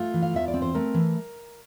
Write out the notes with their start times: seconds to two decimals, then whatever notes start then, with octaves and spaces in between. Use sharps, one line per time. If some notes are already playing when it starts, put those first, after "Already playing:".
Already playing: A3 F4
0.14 E3
0.22 F5
0.34 E2 E5
0.48 D5
0.54 C4
0.62 C5
0.74 A3 A#4
0.94 E3